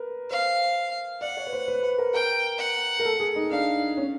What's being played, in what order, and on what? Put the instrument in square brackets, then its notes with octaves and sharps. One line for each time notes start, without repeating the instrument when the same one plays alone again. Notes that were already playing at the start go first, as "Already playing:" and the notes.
Already playing: [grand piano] A#4 B4
[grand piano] C5 [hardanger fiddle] F5
[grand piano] D5 [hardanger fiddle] F#5
[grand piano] C#5
B4
C5
B4
B4
A#4
[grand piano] A#4 [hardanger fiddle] G5
[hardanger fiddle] F#5
[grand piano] A#4
A4
G#4
D#4
[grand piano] D4 [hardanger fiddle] F5
[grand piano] C#4